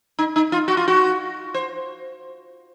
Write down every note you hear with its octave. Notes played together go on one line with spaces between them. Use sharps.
D#4
D#4
F4
F#4
F4
F#4
C5